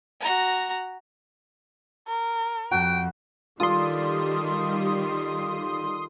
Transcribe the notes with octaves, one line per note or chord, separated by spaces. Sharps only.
F#4 A#5
A#4
F2 F#4 G5
D#3 G3 F4 A4 D5 C6 D#6